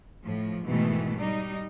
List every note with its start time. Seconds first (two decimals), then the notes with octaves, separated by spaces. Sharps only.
0.24 A2 F3
0.65 G#2 B2 D#3 E3 A3
1.20 G3 D#4